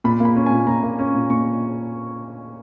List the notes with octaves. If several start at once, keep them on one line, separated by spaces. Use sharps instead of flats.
A#2 B5
A#3 B5
C#4
A#2 G#5
A#2 A#5
A#3
C#4
A#2
A#2 C#6